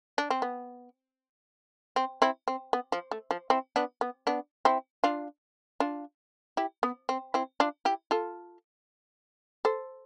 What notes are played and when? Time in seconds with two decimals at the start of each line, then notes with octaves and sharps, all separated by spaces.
0.18 D4
0.30 C4
0.42 B3
1.96 C4
2.22 C4 E4
2.48 C4
2.73 B3
2.92 F3
3.11 A3
3.31 F3
3.50 C4 E4
3.76 B3 D4
4.01 B3
4.27 B3 D4
4.65 C4 E4
5.04 D4 F4
5.80 D4 F4
6.57 E4 G4
6.83 B3
7.09 C4
7.34 C4 E4
7.60 D4 F4
7.85 E4 G4
8.11 F4 A4
9.65 A4 C5